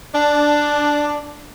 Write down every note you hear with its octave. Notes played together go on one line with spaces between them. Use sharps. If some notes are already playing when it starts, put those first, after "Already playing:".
D4